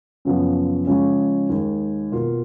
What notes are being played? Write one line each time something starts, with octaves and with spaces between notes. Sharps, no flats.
F#2 C#3 F3 B3
C#3 F3 G#3 C#4
D#2 D#3 G#3
B2 A#3 F4